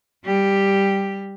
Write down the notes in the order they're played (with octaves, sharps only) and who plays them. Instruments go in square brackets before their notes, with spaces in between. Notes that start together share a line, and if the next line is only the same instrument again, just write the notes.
[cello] G3 G4